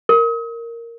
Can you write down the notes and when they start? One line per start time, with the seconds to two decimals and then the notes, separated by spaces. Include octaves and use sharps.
0.09 A#4